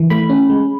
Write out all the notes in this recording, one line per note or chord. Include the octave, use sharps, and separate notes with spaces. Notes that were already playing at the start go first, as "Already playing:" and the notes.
Already playing: E3
A3 B5
C#4
G#3